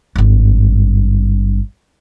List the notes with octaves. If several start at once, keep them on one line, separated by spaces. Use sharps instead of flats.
G#1 G2